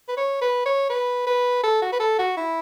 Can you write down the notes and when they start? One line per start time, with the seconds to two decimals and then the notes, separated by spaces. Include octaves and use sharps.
0.08 B4
0.17 C#5
0.41 B4
0.66 C#5
0.90 B4
1.26 B4
1.63 A4
1.82 F#4
1.92 B4
2.00 A4
2.19 F#4
2.37 E4